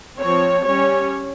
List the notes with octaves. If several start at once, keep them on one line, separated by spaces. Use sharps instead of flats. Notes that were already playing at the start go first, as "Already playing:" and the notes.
F3 C4 C#5
G3 C#4 C#5